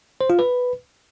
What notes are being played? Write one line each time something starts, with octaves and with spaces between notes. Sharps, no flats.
C5
F4
B4